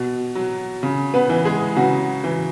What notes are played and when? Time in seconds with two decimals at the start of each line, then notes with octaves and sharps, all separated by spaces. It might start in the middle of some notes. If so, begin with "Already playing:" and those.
Already playing: B2
0.35 F#3
0.83 C#3
1.14 B3 B4
1.29 E3
1.45 G#3 G#4
1.76 C#3 F#3 F#4
2.24 E3